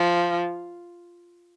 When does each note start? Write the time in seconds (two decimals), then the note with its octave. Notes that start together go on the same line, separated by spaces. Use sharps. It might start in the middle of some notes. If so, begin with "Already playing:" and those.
Already playing: F3